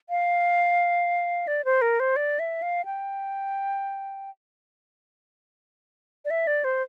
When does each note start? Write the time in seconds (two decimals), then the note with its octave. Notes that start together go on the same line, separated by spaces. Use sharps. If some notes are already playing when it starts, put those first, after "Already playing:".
0.10 F5
1.47 D5
1.65 C5
1.82 A#4
2.00 C5
2.16 D5
2.39 E5
2.62 F5
2.85 G5
6.25 D5
6.30 E5
6.47 D5
6.64 C5